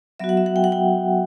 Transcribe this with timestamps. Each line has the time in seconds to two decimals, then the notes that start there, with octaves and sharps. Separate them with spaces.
0.20 F#3 B3 F#4 E5
0.29 F#5
0.37 E5
0.46 F#5
0.56 G5
0.64 F#5
0.72 G5